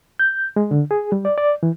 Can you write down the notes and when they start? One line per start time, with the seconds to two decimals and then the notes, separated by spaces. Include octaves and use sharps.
0.19 G6
0.56 G#3
0.71 D3
0.91 G#4
1.12 G3
1.25 D5
1.38 D5
1.63 E3